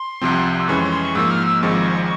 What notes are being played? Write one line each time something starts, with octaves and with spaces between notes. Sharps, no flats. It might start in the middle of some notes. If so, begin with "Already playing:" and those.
Already playing: C6
C2 C3 F3 C4
E6
F2 E3 G#3 C#4 C#6
C6
C6
C#6
G#2 F3 A#3 E6
F6
E6
G#1 G#2 F3 G#3 C4 C#6